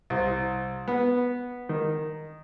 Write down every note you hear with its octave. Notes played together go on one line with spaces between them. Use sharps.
C2
B3
D#3